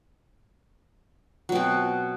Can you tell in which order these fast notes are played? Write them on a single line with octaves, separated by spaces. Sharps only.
F#3 B2 C4